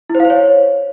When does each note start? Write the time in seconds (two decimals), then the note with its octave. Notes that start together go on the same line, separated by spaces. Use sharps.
0.10 E4
0.15 C5
0.20 F5
0.25 C5
0.30 C#5